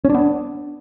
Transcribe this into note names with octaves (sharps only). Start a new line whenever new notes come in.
B3 C#4 D4